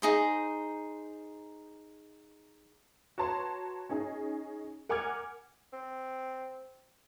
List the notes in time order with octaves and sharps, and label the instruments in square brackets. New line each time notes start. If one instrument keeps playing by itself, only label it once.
[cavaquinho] D#4 G#4 C5
[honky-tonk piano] F#4 B4 C#5 A5 A#5 C6
C#4 D#4 G#4
A#4 F#5 G#5 D6 F6 G#6
[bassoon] C4